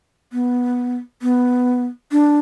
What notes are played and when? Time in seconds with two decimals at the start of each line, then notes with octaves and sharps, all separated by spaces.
0.33 B3
1.22 B3
2.12 D4